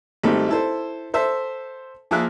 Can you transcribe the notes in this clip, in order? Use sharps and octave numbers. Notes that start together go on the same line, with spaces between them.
G#1 G3 A3 C4 D#4 G4
E4 A4 C5
A4 C5 E5
F3 A#3 G#4 A#4 E5 F#6